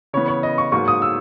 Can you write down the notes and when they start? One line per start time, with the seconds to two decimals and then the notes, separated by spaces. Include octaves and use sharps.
0.13 C#3 E3 B3 C#5
0.28 C#5
0.43 D#5
0.58 C#6
0.72 G#2 F#3 A#3 C#6
0.88 D#6
1.02 E6